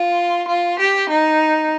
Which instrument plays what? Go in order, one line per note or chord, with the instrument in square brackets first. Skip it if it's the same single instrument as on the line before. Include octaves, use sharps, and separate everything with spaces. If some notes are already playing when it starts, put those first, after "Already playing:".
Already playing: [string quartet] F4
F4
G4
D#4